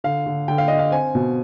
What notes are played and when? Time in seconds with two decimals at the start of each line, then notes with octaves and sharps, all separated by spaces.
0.04 D3 F5
0.26 D3
0.48 D3 G5
0.58 F5
0.68 D4 D#5
0.79 F5
0.92 C4 G#5
1.15 B2